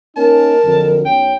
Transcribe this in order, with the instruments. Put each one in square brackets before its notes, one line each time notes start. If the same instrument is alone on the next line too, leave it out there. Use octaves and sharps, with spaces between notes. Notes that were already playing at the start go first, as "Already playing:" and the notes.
[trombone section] A#3 C#4 D#4 [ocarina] A#4 [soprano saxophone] A5
[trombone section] F2 D3 F#3
[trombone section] B1 C#4 [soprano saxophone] G5